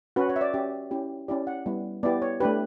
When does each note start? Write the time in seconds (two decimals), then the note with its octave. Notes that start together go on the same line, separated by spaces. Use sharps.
0.16 C#4 F#4 B4
0.29 C#5
0.36 E5
0.41 D5
0.54 C#4 G4 E5
0.91 C#4 E4 G4
1.28 C#4 E4 G4 D5
1.47 F#5
1.66 G3 B3 E4
2.03 B3 E4 G4 D5
2.22 C#5
2.40 A3 D4 G4 B4